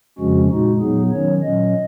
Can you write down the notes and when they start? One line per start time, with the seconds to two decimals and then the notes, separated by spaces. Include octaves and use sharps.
0.18 F2 C#3 F3 G#3 C#4 F#4
0.49 A#2 G#3 D#4 F#4
0.80 A#2 F#3 B3 D#4 G#4
1.12 D#3 F#3 C#4 C#5
1.42 A#2 F#3 C#4 D#5